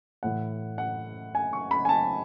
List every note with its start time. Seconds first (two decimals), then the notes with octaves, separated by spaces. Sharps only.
0.23 A2 E3 F#5
0.78 F#5
1.35 G#5
1.53 C#6
1.71 B5
1.85 G#5
1.89 A5